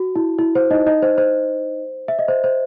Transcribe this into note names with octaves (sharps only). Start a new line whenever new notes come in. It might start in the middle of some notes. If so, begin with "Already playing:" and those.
Already playing: F#4
E4
E4
C5
D#4 D#5
D#4 D#5
C5
C5
E5
D#5
C5
C5